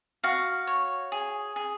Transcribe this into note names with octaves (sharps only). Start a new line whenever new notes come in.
F#4 F5
C#5
G#4
G#4